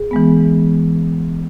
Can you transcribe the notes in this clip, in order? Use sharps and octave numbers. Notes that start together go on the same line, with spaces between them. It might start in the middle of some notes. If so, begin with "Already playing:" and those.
Already playing: G#4
E3 G#3 B3